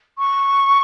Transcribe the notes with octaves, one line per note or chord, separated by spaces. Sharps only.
C#6